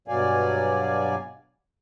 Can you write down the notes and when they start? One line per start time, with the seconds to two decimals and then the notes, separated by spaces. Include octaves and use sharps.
0.08 G2 B2 F#3 D5 F5 G#5